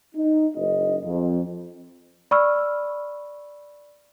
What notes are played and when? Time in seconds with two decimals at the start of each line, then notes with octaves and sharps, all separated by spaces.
0.15 D#4
0.55 F#1 D#5
1.04 F2
2.31 D5 B5 C#6 E6 F6